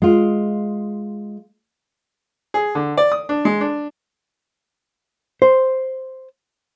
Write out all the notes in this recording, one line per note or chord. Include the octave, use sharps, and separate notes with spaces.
G#3 F4
G#4
D3
D5
D#6
D4
G#3
D4
C5